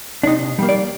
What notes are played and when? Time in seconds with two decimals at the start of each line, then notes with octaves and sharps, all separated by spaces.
0.23 D4
0.27 C3 D#4
0.58 G3 A#3
0.69 D5